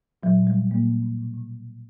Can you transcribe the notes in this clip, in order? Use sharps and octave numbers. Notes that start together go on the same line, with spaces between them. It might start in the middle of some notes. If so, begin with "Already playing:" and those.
A#2 F#3
A#2
G3
A#2
A#2 A#3
A#2
A#2
B2
B2